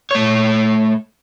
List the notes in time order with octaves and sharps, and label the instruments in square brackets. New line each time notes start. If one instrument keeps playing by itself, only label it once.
[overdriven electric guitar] A3 C#5